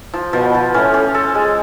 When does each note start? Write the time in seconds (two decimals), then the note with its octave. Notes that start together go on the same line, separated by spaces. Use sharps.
0.14 F3
0.33 B2 F3
0.54 F3
0.74 A2 C#4
0.94 C#4
1.14 A4
1.35 G#3